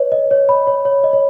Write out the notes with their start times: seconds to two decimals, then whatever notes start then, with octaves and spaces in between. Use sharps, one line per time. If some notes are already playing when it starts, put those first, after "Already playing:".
Already playing: B4 C#5 D#5
0.12 D#5
0.31 C#5
0.49 B5
0.67 C#5
0.85 C#5
1.04 D#5
1.13 C#5